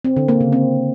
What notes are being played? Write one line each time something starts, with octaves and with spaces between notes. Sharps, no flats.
C4
D3
A#3
C#3
C4